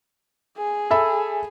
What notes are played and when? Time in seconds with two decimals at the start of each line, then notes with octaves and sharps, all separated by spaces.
0.57 G#4
0.91 A4 E5 B5